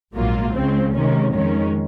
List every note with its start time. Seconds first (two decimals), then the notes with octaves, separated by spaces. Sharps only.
0.14 A#1 G#2 F#3 A#3 F4
0.53 C#2 C#3 G#3 C4
0.93 C3 D#3 G#3 C#4
1.33 F2 D#3 G#3 C#4